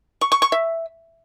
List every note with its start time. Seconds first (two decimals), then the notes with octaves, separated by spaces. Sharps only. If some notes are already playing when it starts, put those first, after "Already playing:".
0.21 C#6
0.32 C#6
0.42 C#6
0.52 E5